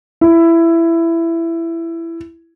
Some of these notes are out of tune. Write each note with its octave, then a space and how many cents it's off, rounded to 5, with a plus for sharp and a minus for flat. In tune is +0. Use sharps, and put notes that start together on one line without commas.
E4 +15